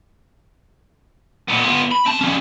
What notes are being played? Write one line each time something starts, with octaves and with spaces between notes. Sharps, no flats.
A#2 B3
B3 F4
B5
C4 A5
F3 C#4